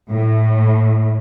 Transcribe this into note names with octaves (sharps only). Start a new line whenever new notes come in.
A2